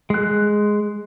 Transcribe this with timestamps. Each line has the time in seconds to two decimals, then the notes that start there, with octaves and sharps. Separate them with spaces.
0.10 G#3 F#6